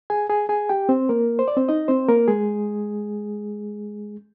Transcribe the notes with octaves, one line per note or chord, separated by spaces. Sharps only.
G#4 G#5
G#4 G#5
G#4 G#5
G4 G5
C4 C5
A#3 A#4
C5
D5
C4 C5
D#4 D#5
C4 C5
A#3 A#4
G#3 G#4